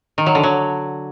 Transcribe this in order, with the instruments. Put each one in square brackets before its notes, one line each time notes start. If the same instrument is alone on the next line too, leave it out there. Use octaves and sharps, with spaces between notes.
[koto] D#3
F#3
D3
F#3